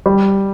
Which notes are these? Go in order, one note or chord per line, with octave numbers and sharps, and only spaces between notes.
G3